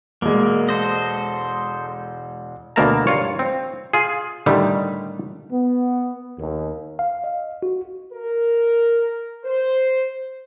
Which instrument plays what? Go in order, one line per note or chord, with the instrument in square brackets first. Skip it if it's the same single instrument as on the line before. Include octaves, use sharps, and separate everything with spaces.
[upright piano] E1 G#3 [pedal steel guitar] A#3
[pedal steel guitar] A4 C5 D#5
[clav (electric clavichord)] D2 B2 A#3 A#4 A5 A#5
G2 F4 C#5
C4
F4 G#4
A2 D3 D#3 G3 A3
[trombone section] B3
D#2
[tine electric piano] F5
D#5
F#4
[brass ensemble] A#4
C5